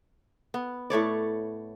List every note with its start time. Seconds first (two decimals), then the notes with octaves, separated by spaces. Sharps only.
0.54 B3
0.90 A2 A3 C#5 D5